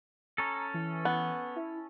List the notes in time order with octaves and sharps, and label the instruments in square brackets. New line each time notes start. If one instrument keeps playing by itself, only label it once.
[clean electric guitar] C#4 A4 [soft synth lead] A#5
[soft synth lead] E3
[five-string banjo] B3
[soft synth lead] E4